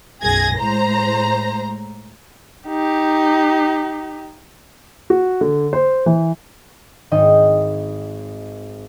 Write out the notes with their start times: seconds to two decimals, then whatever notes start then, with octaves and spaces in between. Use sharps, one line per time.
0.22 B1 F#2 G#4 G#6 A#6
0.59 A2 G#3 C5 A#5
2.68 D#4 G4
5.10 F#4
5.41 D3
5.73 C5
6.06 E3
7.11 G#1 D#3 D#4 D#5 G5